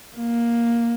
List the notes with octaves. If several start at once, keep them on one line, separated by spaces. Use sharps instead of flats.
A#3